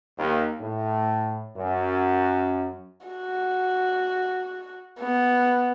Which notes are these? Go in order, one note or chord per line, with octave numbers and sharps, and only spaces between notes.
D#2
A2
F#2
F#4
B3